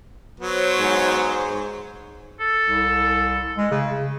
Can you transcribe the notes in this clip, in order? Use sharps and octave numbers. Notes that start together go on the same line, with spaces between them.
F#3 B3 C5 C#5
G#2
A4
C2
G#3
C#3